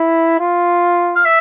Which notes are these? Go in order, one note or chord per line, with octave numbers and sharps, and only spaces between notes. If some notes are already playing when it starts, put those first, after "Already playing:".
Already playing: E4
F4
F5
E5